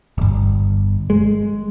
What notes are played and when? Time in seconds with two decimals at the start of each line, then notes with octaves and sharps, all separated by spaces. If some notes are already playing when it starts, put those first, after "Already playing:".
0.18 D1 G1
1.10 G#3